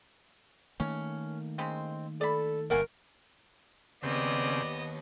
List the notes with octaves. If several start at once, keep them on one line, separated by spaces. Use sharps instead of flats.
D#3 A3 A#3 C#4
C#3 G#3 C4
A4 D5 B5
G1 B2 A3 A#4 F#5 G#5
D#2 C#3 B3 C4 D5 D#5